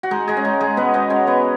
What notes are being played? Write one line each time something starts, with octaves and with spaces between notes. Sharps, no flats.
F#4
G#3 D#4
G#3 G#4
C#4
G#3 D#4
G#3 G#4
B2 B3 B4
D#4 D#5
G#3 C#4 C#5
B3 B4